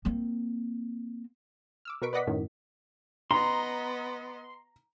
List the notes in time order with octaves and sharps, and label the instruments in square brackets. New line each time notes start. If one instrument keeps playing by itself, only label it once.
[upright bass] A#3 C4
[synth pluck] D6 E6 F6
B2 A#4 B4 C#6 B6 D7
B4 D5 D#5 F#5 D6 B6
F#2 A2 D#3
[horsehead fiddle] B3 D#5 [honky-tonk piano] A#5 [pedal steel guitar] C6